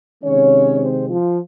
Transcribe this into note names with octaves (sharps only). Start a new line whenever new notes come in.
C3 D#3 G#3 C#4 C#5
C4 C5
F3 F4